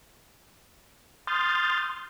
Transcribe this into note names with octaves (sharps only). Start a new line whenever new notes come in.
C6 D#6 F6 G6 A6